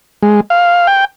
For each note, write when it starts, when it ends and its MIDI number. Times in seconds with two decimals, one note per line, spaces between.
0.22 0.40 56
0.50 0.87 77
0.87 1.05 79